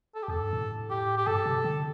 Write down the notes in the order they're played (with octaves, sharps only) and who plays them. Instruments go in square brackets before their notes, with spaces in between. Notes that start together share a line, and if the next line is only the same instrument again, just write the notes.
[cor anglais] A4
G4
[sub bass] E2 [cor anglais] A4
[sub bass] G2
A2
[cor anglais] G4
G4
[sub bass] G2 [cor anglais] A4
[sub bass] C3
D3